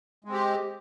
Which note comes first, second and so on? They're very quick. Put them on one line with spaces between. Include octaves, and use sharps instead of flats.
G#3 C4 G4